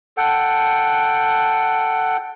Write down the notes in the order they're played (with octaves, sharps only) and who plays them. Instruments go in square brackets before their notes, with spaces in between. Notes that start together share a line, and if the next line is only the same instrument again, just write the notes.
[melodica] A4 F#5 G5